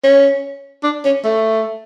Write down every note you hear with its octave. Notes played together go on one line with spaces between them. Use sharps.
C#4
D4
C#4
A3